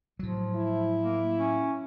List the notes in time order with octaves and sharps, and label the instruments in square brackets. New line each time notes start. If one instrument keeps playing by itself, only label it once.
[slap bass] A2 F#3 [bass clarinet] F3
[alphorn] E4
[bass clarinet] A#3
C#4